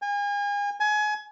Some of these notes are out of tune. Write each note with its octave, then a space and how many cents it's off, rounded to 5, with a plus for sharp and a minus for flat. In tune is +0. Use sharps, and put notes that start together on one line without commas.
G#5 -35
G#5 +25